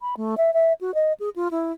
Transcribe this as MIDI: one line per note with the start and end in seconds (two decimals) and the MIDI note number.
0.01 0.15 83
0.17 0.35 57
0.38 0.53 76
0.54 0.73 76
0.81 0.94 66
0.94 1.13 75
1.20 1.30 68
1.36 1.48 65
1.51 1.72 64